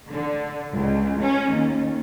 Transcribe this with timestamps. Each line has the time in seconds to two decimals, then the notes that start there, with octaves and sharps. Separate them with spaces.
0.11 D3
0.71 C#2
1.20 C#4
1.50 D#2